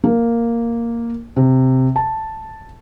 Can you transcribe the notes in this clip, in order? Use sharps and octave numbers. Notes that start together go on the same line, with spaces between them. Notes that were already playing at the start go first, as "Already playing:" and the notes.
A#3
C3
A5